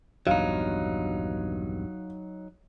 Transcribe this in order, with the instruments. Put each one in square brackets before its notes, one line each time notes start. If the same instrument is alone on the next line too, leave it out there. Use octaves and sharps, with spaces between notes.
[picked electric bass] A#1 E2 G2 [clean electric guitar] F#3 D#4 [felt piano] F5